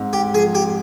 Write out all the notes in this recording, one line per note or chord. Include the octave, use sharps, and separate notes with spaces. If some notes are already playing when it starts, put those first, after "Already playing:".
Already playing: G#2 C4
G4
F3 G#4
G4